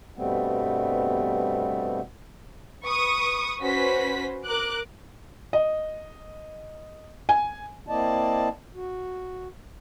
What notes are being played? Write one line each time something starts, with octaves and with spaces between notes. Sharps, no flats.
G2 B2 G3 A3 B3 C4
B4 C#6 D#6
C#4 F#4 B4 C5 B6
A#4 D6 F#6
D#5
G#5
A#3 C4 E4 D5 D#5 A5
F#4